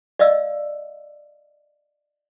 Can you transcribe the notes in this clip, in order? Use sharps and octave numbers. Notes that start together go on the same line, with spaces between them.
D5 D#5 F5 E6